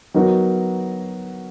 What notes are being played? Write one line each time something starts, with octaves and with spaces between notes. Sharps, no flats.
F#3 B3 D#4 F#4 A#4